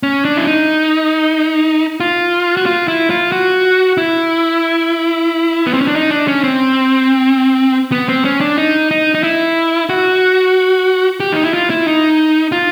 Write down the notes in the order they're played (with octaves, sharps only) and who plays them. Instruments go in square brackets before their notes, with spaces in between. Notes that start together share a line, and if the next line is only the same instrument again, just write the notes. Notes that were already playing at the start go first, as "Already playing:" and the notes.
[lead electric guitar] C#4
D4
E4
D#4
F4
F#4
F4
E4
F4
F#4
E4
B3
C4
C#4
D4
D#4
D4
C#4
C4
B3
C4
C#4
D4
D#4
D#4
D#4
E4
F#4
G4
D#4
E4
F4
E4
D#4
F4